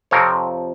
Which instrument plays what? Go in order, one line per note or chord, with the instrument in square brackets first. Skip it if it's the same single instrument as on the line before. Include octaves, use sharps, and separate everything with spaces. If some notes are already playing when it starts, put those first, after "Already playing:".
[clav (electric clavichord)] F2 C3 F3 C4 A#4 C#5